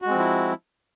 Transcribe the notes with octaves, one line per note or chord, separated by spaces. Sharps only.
F3 G#3 C4 E4 F#4